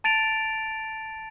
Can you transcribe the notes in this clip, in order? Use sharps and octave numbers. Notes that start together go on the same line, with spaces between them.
A5 A6 D7 F7